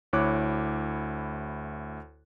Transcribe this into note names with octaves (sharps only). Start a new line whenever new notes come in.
D2 E4 C#5 D6 F#6